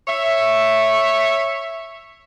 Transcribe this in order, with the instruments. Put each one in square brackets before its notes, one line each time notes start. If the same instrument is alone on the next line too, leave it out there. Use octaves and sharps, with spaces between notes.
[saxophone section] C#5 E5